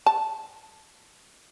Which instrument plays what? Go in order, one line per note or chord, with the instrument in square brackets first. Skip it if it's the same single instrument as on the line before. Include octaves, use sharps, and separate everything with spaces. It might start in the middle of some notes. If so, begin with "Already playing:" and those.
[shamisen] A5